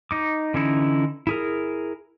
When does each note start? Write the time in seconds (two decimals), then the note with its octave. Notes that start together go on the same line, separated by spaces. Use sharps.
0.11 D#4 D6
0.54 D3 E3 C#4 D#4 E4
1.27 E4 G#4 A#4